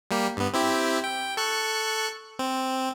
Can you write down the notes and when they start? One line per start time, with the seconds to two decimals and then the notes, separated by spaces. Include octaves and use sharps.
0.11 G3 A#3 G4
0.37 G2 B3
0.54 C4 E4 G4
1.04 G5
1.37 A4 C#6 F#6
2.39 C4